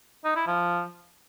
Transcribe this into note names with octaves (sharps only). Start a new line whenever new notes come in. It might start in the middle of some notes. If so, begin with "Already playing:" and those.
D#4
E4
F3